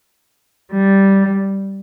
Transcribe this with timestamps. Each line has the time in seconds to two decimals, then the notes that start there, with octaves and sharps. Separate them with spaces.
0.72 G3